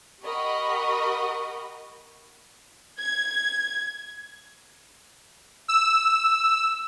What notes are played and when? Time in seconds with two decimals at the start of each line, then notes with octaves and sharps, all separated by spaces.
0.22 G4 A#4 D#5 F#5 B5 C#6
2.98 G#6
5.68 E6